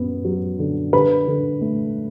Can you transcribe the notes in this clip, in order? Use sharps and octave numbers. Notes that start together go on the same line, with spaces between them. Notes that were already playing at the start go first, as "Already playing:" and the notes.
Already playing: F#2 B3
F#3
D3
D3 B4
D3
A3